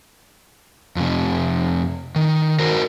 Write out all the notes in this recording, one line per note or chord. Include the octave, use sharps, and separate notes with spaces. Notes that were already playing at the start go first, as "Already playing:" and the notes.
F2 C3
D#3
F#4 A#4 C5